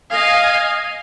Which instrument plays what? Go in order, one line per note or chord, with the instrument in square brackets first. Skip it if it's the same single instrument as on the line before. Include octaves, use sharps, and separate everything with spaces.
[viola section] D#5 F5 G#5